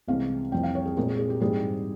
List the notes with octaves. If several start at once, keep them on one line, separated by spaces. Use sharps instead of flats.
C2 C3 E3 G#3 F5
F2 E3 G3 C4 G5
F5
C#5
G#4
A#2 G#3 C4 A#4
G#4
G#4
G4
G#2 E3 G3 C4 G#4